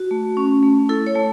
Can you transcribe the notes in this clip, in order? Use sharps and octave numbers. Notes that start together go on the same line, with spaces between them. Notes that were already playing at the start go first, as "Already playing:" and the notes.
Already playing: F#4
A3
C#4
A3
E4 A4
C#5
A3